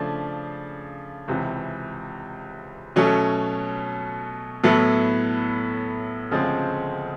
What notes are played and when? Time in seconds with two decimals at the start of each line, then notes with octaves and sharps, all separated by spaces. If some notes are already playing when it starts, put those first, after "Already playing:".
Already playing: C#3 F3 A3 D4
1.28 C#2 C3 E3
2.96 B2 F#3 A3 C#4
4.63 A2 F#3 B3 E4 A4
6.31 D2 C#3 F3 G#3 C4